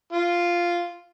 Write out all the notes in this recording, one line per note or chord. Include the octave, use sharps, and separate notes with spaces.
F4